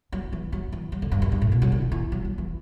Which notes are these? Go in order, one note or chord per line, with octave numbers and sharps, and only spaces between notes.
F#3
E3
F#3
E3
F#3
D3
G2
F#2
G2
A2
B2
F#3
D3
E3
F#3
F#3
E3